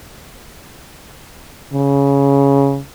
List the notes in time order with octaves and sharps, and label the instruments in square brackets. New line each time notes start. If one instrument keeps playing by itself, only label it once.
[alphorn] C#3